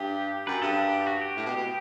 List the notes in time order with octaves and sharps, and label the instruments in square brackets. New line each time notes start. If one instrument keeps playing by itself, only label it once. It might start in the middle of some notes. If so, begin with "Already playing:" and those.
Already playing: [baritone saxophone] G2 [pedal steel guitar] G4
[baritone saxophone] F#2 [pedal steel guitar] B4
[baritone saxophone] G2 [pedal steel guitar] A4
[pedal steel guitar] G4
F#4
G4
[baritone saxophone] A2
B2
B2